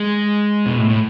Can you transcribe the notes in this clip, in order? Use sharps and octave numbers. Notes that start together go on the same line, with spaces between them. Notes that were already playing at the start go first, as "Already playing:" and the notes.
Already playing: G#3
B2
A2
A2